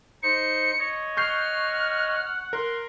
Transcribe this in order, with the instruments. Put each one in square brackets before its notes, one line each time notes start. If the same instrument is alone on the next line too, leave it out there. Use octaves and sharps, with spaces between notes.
[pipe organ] D#4 C5 [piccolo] C#7
[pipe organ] C#5 D#5
[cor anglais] F#5 [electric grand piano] C#6 G6 C7 [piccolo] F6
[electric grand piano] A#4 [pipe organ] C6